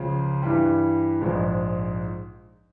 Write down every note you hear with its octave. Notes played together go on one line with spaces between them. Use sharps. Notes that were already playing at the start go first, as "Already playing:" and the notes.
Already playing: C#2 C#3 F3
G2 E3 G3
A#1 G#2 F3 G#3